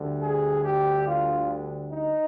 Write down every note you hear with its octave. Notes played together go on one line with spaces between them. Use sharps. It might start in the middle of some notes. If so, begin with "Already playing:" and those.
Already playing: D2 D3 G3
G#4
G4
F4
D#4